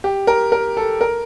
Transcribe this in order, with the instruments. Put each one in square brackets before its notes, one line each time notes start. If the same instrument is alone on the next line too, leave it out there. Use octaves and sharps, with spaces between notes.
[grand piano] G4
A#4
A#4
A4
A#4